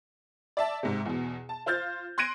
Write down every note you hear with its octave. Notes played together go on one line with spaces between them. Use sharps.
D5 E5 A5
G#2 C3
E2 B2
A5
F4 C5 F6 G6 A6
C6 F#6 G#6 A#6 D7 D#7